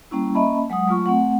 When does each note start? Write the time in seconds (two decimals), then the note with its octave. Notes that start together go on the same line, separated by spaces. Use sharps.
0.11 G3 A#3 C#4 E4
0.35 A#3 C#4 D#5 E5 A5 B5
0.70 F#3 G#3 F#5 D#6
0.88 F#3 A3 F4 C#6
1.06 A3 C4 F#5